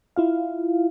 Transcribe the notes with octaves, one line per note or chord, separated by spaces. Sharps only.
E4 F4 F5